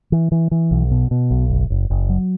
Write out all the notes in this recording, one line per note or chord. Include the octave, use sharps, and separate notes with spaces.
E3
E3
E3
B1
B2
B2
B1
F#1
F#1
F#1
F#3